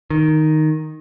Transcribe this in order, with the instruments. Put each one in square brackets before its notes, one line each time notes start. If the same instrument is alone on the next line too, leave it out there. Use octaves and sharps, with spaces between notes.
[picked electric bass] D#3